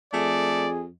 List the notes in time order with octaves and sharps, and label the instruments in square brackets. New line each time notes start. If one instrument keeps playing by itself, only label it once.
[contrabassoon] F2 [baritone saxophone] A3 [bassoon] G#4 [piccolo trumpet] D5